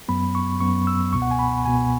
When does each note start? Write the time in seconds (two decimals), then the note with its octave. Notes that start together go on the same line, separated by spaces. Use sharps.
0.08 F#2 F#3 B3 B5
0.35 C#6
0.60 F#2 F#3 B3 C#6
0.87 E6
1.13 C#2 B2 B3 C#6
1.22 F#5
1.31 G#5
1.39 B5
1.65 C#2 B2 B3 G#5